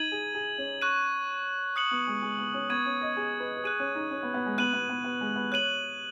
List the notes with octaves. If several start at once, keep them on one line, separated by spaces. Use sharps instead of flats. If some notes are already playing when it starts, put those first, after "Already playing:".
Already playing: D#4 G#6 D#7 F#7
G#4
G#4
C#4
C#6 F#6 D#7
D#6 F#6 C#7 F#7
B3
G#3
G#3
B3
C#4
B3 C#6 G#6 D#7
C#4
D#5
G#4
B4
B4
G#4 F#6 D#7 F#7
C#4
D#4
C#4
B3
B3
G#3
B3 F#6 D#7 F#7
B3
B3
B3
G#3
B3
C#5 F#6 D#7 F#7